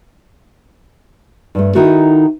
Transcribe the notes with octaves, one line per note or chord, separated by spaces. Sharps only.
G2 A3
D#3 D#4 E4 F#4 A4